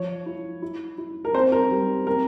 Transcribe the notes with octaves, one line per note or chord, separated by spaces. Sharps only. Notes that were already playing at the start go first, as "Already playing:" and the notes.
Already playing: F3 C#5
E4
E4
E4
A#4
C4 C5
A#4
G3
C4 A#4